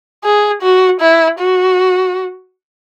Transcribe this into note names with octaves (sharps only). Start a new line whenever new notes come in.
G#4
F#4
E4
F#4